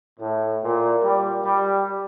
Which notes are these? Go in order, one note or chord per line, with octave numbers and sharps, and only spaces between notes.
A2
A#2
G3
G3